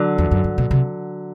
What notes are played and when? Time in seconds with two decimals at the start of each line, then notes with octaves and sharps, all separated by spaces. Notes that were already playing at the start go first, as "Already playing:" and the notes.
Already playing: D3 F#3
0.18 E2
0.31 F#2
0.44 G2
0.58 B2
0.71 C3